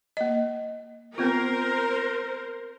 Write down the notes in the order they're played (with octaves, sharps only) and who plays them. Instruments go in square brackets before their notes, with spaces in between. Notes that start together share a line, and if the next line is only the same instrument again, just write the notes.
[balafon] A#3 D#5
[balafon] B3 C4 F4 [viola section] A#4 C5